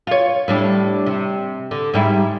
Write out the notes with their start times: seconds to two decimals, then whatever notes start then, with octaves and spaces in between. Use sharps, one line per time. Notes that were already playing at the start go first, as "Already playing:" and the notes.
0.07 F4 C#5
0.48 A2 G3 D4
1.06 C3
1.71 D3
1.94 G#2 G3 E4